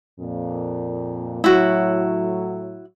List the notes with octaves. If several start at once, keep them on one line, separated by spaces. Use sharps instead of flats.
F2 A#2
A2 F#3 E4 F#4